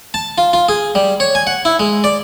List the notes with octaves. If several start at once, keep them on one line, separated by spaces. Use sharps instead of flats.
A5
F4
F4
G#4
G3
C#5
G#5
F#5
E4
G#3
D5